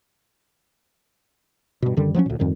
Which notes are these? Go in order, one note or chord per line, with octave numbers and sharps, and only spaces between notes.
G2 B2
F#2 D3 D#3 G3
F3 F#3 A#3 C#4
D2 A#2
F2 G#2 D#3 G3